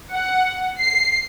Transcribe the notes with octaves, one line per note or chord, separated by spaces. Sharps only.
F#5
C7